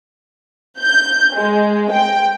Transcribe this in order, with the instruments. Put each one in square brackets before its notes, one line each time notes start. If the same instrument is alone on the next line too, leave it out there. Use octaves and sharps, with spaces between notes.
[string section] G6
G#3
G5